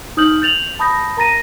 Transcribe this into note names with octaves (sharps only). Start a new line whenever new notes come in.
D#4 D#6 F6 G6 F#7
G6 A6 F7 F#7
A5 B5 D#6 G6 A#6
A#4 A#5 A6 A#6 D#7